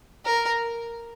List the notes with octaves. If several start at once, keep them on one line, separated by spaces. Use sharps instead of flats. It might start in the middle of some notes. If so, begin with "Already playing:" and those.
A#4